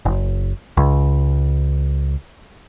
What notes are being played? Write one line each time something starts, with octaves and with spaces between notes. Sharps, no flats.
F#1
C#2